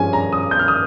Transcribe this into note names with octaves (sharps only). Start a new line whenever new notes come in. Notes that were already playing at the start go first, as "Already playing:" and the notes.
Already playing: G2 F3 G#3 C#4 G#5
A#5
D#6
G6
F6
D#6